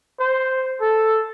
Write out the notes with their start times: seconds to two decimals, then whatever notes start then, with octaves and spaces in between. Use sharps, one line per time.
0.20 C5
0.81 A4